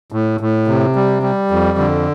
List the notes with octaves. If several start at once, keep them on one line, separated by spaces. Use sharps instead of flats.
A2
A2
C3
G3
G3
F2
D3